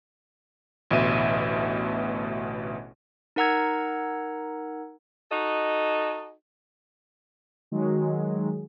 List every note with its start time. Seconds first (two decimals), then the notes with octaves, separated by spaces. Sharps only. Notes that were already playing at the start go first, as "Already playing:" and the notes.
0.91 A1 D2 B2 E5 D#7
3.36 D#4 A#4 F#5 A#5 E6 G#6
5.31 D#4 F#4 A4 D#5
7.71 D#3 F#3 G#3